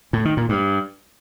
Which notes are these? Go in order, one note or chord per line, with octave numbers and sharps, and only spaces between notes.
A2
D#3
A#2
G2